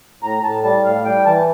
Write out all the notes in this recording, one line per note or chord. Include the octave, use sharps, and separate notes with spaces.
A2 A#5
A2 A5
G3 A5
A2 F5
G3 G5
E3 A5